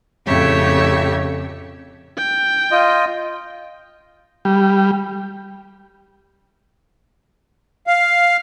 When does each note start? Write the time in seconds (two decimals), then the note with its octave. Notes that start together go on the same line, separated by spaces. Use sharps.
0.25 F2 A2 C#3 G4 C#5 E5
2.18 G5
2.71 F4 D#5
4.45 G3
7.87 F5